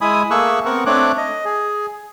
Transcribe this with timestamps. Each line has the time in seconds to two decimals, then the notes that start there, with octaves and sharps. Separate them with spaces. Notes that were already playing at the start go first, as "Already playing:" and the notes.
0.01 G#3 E4 G#5 B5 D#6
0.31 A3 A#3 G#4 C#6 E6 F#6
0.65 B3 C4 A#4 F#5 C#6
0.86 A3 C4 D4 C#5 D6 F#6
1.17 D#5
1.45 G#4